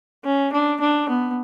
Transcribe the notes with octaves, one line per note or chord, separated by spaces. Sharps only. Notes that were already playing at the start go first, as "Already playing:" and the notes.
C#4
D4
D4
B3